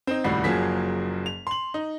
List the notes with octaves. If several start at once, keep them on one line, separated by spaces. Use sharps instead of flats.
C4 D#4
D#1 C#2 A2 G3 F#4 C7
F#1 F3 F#3 A#3 G#4 B6
F7
C6 F#7
D#4